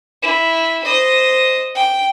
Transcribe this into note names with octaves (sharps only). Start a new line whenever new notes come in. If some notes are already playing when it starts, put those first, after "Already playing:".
E4
C5 D#5
G5